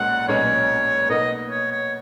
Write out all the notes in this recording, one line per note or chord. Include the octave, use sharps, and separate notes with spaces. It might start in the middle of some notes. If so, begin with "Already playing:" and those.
Already playing: B1 A#2 G#3 C#4 F#5
B1 A#2 G#3 C#4 C#5
B2 A#3 D#4 D#5
C#5
C#5